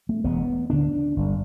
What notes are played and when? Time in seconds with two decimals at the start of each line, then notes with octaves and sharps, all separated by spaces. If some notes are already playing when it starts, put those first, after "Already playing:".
0.09 A3
0.24 E1 E2 B2 B3
0.70 D2 D3 D4
1.16 G1 G2 D3